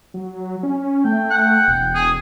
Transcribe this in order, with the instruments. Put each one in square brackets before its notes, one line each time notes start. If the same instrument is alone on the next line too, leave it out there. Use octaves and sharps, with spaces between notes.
[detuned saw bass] F#3
C#4
[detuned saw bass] A3 [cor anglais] G5
[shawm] F#5
[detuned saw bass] E1
[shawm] G#4